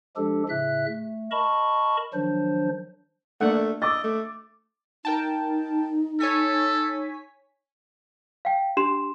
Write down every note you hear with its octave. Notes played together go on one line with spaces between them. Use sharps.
F3 G#3 D4 G4 A4
A2 C#3 E5 F#6
A3
A#4 D#5 A5 B5 C#6
D#3 F3 F#3 D4 C5
A3 A#3 D4 F#5
D#5 D6 E6 A6
A3
D#4 A#4 G5 A5
A4 C#5 G#5 B6
F5 G5
D4 G4 C6 E7